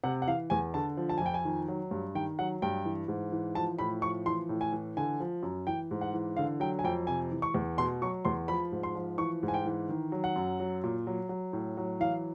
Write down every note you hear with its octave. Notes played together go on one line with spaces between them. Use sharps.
C3 F#5
F#5
E3 F5
E2 G#5
D3 A5
F3
A5
F2 G#5
G5
G#5
D#3
F#3
G2
D#3 G5
F#3 F#5
G2 G5
E3
G#2
E3
F3 A5
A2 B5
F3 C#6
E3 C6
A2
G#5
E3
D3 G#5
F3
F#2
E3 G5
G#2
F#5
E3
D3 F5
F#3 G5
G#5
F2 G5
C3 G#5
E3
C#6
E2
B2 C6
F#3 C#6
E2 C6
F3 B5
G#2
C6
F3
E3 C#6
G#2
G#5
G5
E3
D#3
F#3
F#5
F#2
F#3
A#2
F#3
F#3
A2
F#3
E3 F5